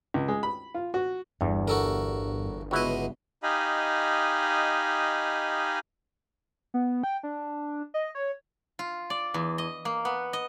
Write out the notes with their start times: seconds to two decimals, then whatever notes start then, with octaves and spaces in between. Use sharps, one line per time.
0.14 C#2
0.28 G#3
0.43 B5
0.74 F4
0.94 F#4
1.41 G1 E2 G2
1.68 F#4 A4 A#4
2.71 C#2 B2 E4 F#4 D#5
3.43 D#4 G4 D#5 F5 G#5 B5
6.74 B3
7.04 G5
7.23 D4
7.94 D#5
8.15 C#5
8.79 F4
9.10 D5
9.34 E2
9.58 D#5
9.85 A#3
10.05 B3
10.33 D#5